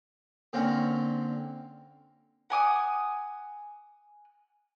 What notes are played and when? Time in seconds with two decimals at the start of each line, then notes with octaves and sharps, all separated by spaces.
0.53 A#2 D3 A#3 C4 C#4
2.50 F#5 G#5 D6 D#6